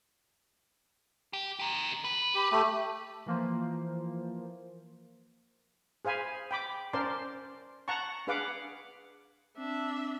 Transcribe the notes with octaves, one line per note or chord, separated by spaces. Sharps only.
G4
G4 A#4
B4
G4
A3 G4
E3 F3 A#3 F4 C5
G#4 C5 F5 G#5 B5
G5 B5 D6
C#4 A#4 C5 D5 A5 C6
F#5 A5 A#5 C#6
D4 G#4 B4 F5 F#5 D6
C4 D4 E5